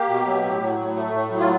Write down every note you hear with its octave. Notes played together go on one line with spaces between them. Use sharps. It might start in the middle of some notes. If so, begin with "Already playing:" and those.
Already playing: A#3 G4
B2
F#3
A2
F#3
A2
A3
A2
F#3
F4